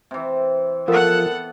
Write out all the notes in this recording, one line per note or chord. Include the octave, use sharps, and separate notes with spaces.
C3 E3
F3 B3 F4 A4 A#4 F#5